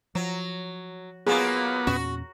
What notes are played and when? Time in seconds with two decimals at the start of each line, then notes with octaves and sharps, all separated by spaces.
0.15 F3 F#3
1.27 F#3 A#3 B3 F4 G#4
1.87 E2 A#2 C#4 F#4